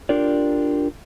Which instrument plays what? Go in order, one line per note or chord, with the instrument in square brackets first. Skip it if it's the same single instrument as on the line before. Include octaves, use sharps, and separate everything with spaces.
[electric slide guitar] D4 F4 G4 A#4 D5